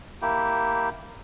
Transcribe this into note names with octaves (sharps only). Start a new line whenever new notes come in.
A#3 E4 G4